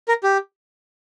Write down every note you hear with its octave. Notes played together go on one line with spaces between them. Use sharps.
A#4
G4